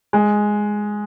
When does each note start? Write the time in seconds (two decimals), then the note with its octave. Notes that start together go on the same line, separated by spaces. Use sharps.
0.13 G#3